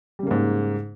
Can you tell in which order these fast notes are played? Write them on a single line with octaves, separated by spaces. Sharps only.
G3 C#3 A#3 G#2